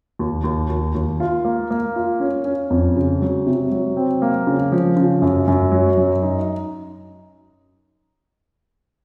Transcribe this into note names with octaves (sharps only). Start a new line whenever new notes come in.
D#2
D#2
D#2
D#2
F4
A#3
A#3
F4
C#4
C#4
F2
C#3
F#3
C3
F#3
C4
A#3
C#3
F3
C#3
F#2
F#2
F#3
F#2
D#4